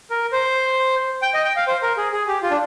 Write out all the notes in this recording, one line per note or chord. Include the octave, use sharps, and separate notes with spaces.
A#4
C5
G5
D#5
G5
F5
C5
A#4
G#4
G#4
G4
F4
D4